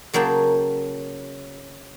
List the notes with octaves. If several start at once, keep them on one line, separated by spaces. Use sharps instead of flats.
C#3 F#3 A#3 G5 A5